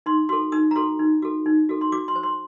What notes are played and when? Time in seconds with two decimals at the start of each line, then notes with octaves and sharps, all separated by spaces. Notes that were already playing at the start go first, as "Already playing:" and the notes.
0.06 D#4 C6
0.29 F#4 A4 C6
0.52 D#4 D#6
0.71 A#5
0.76 F#4 A4 C6
0.99 D#4
1.22 F#4 A4
1.46 D#4
1.69 F#4 A4
1.81 C6
1.92 F#4 D6
2.08 C6
2.16 C5
2.23 C6